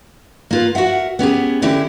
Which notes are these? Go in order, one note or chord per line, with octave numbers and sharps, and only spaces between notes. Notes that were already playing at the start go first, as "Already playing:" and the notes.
A#3 F4 B4
F#4 A#4 E5 F#5
B3 C#4 G4 G#4
D3 E3 C#4 E4 G4